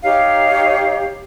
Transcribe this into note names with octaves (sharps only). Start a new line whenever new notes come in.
D#4 G4 C#5 F5